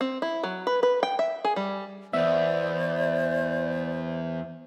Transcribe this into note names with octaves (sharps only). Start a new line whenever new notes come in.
C4
E4
F#3
B4
B4
G5
E5
G#4
G3
E2 B3 C5 D5 E5